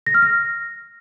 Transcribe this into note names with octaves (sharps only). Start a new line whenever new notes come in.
A#6
F6
A#6